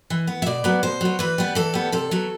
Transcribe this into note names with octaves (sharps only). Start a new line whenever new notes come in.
E3
B3
E5
B2 D5
F#3 B3
B2 C5
F#3 B3
E3 B4
G3 B3
E3 A4
G3 B3
C3 A4
F#3 B3